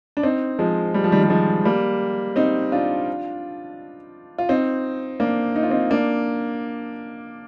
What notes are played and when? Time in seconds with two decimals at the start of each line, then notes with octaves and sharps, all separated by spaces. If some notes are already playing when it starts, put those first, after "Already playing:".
0.17 D4
0.23 C4 D#4
0.59 F3 G#3
0.94 G3
1.04 F3
1.12 D#3 G3
1.23 G3
1.30 F3 G#3
1.65 G3 A#3
2.36 C4 D#4
2.72 D4 F4
4.38 F4
4.49 C4 D#4
5.20 A#3 D4
5.56 D#4
5.63 F4
5.70 C4 D#4
5.91 A#3 D4